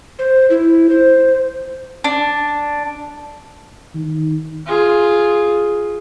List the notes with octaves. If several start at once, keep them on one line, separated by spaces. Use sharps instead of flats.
C5
E4
C5
D4
D#3
F4 G#4